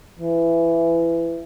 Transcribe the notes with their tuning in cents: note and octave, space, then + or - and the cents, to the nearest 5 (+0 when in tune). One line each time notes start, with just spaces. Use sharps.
E3 +20